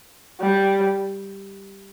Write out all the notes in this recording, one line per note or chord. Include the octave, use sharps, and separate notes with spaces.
G3